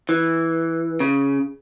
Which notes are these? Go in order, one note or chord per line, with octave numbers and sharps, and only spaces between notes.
E3
C#3